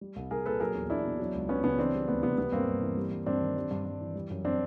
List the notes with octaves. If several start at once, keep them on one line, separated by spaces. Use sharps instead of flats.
G3
C2
C2 G#4 A#4
A#2 A4 B4
F#3 G#4 A#4
E2
E2 D4 E4
B2
F#3
C#2
C#2 B3 C#4
C#3 B3 C#4
E3 C4 D4
G3
D2 B3
C3 B3
G3 B3
G2 A#3 C4
G2
E3
G3
G2
G2 C4 D4
D#3
G3
G2
G2
E3
G3
F#2
C4 D4